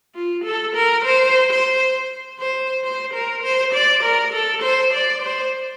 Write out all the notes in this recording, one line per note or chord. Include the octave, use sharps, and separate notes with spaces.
F4
A4
A#4
C5
C5
C5
C5
A#4
C5
D5
A#4
A4
C5
D5
C5